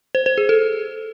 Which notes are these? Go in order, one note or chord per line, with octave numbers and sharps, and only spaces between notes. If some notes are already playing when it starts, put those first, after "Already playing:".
C5
C5
G#4
A4